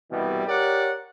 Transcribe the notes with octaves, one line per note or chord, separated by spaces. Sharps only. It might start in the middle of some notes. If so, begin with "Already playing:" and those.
C2 B2 E3 G3
G4 A#4 C#5 D5 F#5